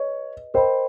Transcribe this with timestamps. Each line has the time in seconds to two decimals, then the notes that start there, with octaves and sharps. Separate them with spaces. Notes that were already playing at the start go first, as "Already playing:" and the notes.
Already playing: G#4 B4 C#5 D#5
0.54 A#4 C5 D#5 G5 B5